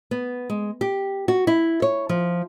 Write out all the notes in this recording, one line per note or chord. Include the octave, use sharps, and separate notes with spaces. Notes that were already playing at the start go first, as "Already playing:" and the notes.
B3
G#3
G4
F#4
E4
C#5
F3